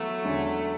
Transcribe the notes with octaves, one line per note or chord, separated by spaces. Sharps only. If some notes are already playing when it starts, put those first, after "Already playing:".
Already playing: E3 F#3 A3 B3
E2 D3 G#3 C#4